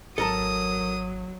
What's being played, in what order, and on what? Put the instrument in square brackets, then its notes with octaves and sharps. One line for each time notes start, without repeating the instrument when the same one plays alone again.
[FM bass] G#1 [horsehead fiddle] F#3 [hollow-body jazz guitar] A4 A#4 A5 [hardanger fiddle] D#6